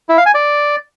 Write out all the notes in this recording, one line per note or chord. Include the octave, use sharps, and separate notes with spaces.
E4
F5
G#5
D5